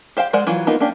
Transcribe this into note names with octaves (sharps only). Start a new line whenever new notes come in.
G4 C5 F5 G5
G#3 A#4 C5 D5 F#5
E3 F#3 F4
A#3 B3 D#4 F4
A#3 C#4 D4 G4